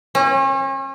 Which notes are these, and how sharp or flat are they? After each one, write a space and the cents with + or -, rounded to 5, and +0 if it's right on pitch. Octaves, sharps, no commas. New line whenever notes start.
C#4 -40